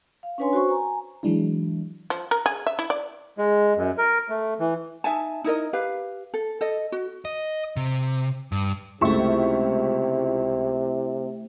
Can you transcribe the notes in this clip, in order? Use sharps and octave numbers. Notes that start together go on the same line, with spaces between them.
F5
C#4 D4 B4 C#5 G#5 C6
F#4 C5 C#6
G#5 A#5
E3 F#3 G#3 D4 E4
F3
A#4
G#4
E5
E4
D5
G#3
F#2
A#4
A3
E3
D#4 E5 G#5 A5
D#4 E4 A#4 D#5
G4 B4 F5
A4
A4 D#5
F#4
D#5
C3
G2
C#2 C3 A3 E4 E5 C#6